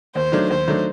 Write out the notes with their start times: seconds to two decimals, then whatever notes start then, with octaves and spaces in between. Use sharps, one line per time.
0.15 D#2 C5
0.32 D#3 F#3 A3 D4
0.49 D#2 C5
0.68 D#3 F#3 A3 D4